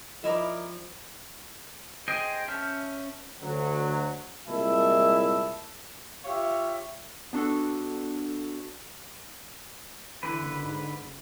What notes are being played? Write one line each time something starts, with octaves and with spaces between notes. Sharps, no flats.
F3 E4 A#4 D5 D#5
G#4 C5 D#5 G5 G#5
C#4 E5 A5 F6 G6
D2 F#3
C2 A#2 G#3 E4 E5 A5
F4 G4 C#5 E5 F5
B3 D4 F#4 A4
D3 E3 B4
F#1
G#2
F#1